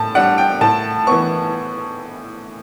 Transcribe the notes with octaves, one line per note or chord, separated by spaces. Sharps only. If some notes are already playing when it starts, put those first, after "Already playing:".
Already playing: A2 A5
G3 D4 F#5
G5
A2 A5
E3 B3 C#6